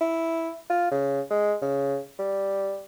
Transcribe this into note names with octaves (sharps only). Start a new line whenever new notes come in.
E4
F4
C#3
G#3
C#3
G3